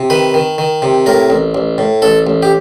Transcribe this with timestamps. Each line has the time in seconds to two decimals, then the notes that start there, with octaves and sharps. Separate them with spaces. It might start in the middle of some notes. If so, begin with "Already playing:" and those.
Already playing: C3
0.10 D#3 B4
0.34 D#3
0.58 D#3
0.82 C3
1.06 A2 A#4
1.30 A1
1.55 A1
1.78 A2
2.02 A1 A4
2.27 A1
2.43 G4